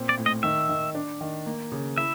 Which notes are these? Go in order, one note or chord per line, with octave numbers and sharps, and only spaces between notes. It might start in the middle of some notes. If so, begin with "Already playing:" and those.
Already playing: A#2 C4
D5
A2
D#5
D#3 E5
D#3
D4
D#3
A#3
C#3
E4 E5